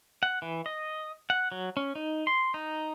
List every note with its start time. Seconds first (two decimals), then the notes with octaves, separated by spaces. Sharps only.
0.23 F#5
0.42 E3
0.66 D#5
1.30 F#5
1.52 F#3
1.77 C#4
1.95 D#4
2.27 C6
2.54 D#4